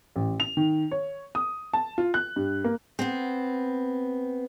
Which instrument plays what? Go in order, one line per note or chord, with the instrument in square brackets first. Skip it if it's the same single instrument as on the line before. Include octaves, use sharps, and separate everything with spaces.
[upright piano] A1
F7
D#3
C#5
D#6
A5
F4
F#6
G2
A#3
[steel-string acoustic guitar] B3 C4